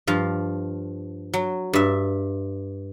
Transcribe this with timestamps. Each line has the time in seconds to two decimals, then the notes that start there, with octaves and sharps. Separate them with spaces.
0.07 G2 F3 F5
1.34 F#3
1.73 G2 E5